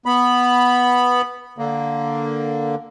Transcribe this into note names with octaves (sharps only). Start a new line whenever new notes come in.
B3 B5
D3 A#3